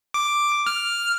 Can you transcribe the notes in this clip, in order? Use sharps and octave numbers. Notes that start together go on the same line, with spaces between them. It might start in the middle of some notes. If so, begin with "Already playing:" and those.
D6
F6